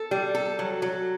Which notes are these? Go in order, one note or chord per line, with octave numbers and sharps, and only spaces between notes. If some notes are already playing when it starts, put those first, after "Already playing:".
Already playing: A4
G3
A4
F#3
F#3